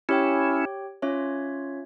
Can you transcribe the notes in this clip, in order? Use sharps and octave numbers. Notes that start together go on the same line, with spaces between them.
C#4 E4 G4 C#5 G5
C#4 F4 C#5 E5